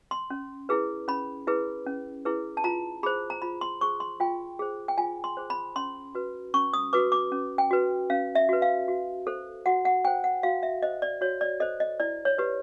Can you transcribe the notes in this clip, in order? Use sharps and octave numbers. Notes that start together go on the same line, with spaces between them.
C6
C#4
E4 G#4 B4
C#4 B5
E4 G#4 B4
C#4
E4 G#4 B4
A5
F4 A#5
G#4 C5 B5
A#5
F4 B5
C6
G#4 C5 C#6
C6
F4 G5
G#4 C5
G5
F4 G#5
C6
G#4 C5
B5
C#4 C6
F#4 B4
C#4 C#6
D#6
F#4 B4 D6
D6
C#4
G5
F#4 B4
C#4 F5
E5
F#4 B4
F5
F#4
A4 C5
F#4 F#5
F#5
A4 C5 G5
F#5
F#4 F5
E5
A4 C5 D#5
D5
F#4 C#5
D5
A4 C5 D#5
D#5
E4 D5
C#5
G4 B4